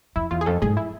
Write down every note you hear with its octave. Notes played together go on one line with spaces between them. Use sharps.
F2 E4
E2 F4
G#4
F2 A4
G#2 G#4
E4